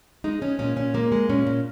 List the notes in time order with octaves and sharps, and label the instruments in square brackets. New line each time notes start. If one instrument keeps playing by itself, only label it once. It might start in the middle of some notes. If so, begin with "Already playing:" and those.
[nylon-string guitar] G#3 D#4
G#3 C#4
A#2 C#4
A#2 C#4
G#3 A#3
G#3
A#2 C#4
A#2